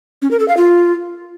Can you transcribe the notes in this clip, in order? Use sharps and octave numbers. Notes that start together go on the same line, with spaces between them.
C#4
A#4
A4
F5
F4